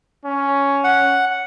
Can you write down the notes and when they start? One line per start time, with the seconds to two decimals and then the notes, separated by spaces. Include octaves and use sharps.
0.25 C#4
0.84 F#5